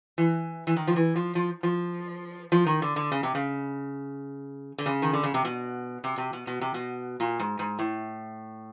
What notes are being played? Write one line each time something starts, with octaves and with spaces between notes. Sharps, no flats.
E3
E3
D#3
F3
E3
F3
F3
F3
F3
D#3
D3
D3
C#3
C3
C#3
D3
C#3
D#3
D3
C#3
C3
B2
C3
C3
B2
B2
C3
B2
A#2
G#2
G#2
A2